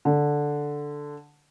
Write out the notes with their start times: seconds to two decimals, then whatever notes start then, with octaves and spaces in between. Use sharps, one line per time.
0.05 D3